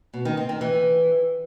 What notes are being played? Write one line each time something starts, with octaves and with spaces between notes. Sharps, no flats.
B2
D#3
C4
D#3
E3